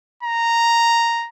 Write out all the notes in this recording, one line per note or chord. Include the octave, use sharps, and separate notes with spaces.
A#5